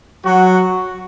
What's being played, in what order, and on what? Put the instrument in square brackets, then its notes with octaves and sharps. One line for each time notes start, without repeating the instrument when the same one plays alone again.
[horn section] F#3 F#4